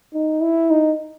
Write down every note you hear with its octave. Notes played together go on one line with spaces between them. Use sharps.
D#4
E4
D#4